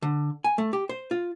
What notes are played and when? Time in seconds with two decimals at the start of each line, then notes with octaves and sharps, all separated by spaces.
0.02 D3
0.44 G#5
0.58 A3
0.73 G4
0.89 C5
1.11 F4